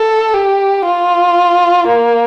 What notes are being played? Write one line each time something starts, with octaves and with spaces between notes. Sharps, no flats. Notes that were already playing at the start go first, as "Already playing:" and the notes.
Already playing: A4
G4
F4
A#3